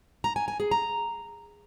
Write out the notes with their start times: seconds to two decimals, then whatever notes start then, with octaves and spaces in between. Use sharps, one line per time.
0.24 A#5
0.36 G#5
0.48 G#5
0.60 G#4
0.71 A#5